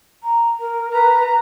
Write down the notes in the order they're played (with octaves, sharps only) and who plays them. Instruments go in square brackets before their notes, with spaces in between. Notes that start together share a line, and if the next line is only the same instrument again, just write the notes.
[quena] A#5
A#4
[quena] B4 [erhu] A#5